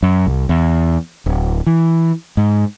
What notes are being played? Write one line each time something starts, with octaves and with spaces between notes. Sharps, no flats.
F#2
C2
E2
D1
E3
G#2